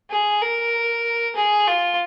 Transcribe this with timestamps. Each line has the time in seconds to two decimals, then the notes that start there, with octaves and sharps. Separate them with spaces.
0.11 G#4
0.42 A#4
1.36 G#4
1.68 F4